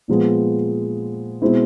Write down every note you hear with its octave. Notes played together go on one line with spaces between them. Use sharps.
A#2 F3 G#3 B3
B2 G#3 C4 E4